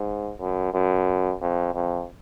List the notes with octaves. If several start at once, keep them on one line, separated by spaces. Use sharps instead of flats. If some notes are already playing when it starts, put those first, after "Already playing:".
Already playing: G#2
F#2
F#2
F2
F2